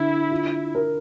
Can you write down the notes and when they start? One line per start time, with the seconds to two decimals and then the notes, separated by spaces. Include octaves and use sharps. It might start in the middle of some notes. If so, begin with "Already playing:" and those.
Already playing: D3 E4
0.31 F4
0.75 A#4